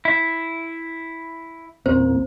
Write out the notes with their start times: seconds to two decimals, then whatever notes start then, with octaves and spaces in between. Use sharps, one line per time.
0.05 E4
1.86 E2 A#2 A#3 C4 C#4 C5